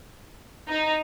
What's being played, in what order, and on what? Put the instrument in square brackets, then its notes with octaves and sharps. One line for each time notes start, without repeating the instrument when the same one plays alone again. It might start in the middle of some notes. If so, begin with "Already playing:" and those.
[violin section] D#4